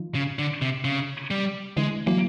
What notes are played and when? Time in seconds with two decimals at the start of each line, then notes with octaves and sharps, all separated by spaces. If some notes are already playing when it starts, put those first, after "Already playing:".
Already playing: D#3 F3
0.15 C#3
0.39 D3
0.62 C3
0.85 C#3
1.31 G3
1.77 D3 E3 G#3
2.07 E3 F#3 A#3